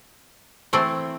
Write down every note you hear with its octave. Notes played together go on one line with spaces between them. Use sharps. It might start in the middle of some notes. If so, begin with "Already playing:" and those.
E3 A3 C4